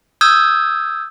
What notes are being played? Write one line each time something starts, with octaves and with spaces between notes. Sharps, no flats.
D#6 E6 G6 G#6